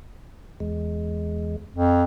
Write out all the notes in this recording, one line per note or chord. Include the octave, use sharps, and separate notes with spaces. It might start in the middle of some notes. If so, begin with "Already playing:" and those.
E2 G#3
F2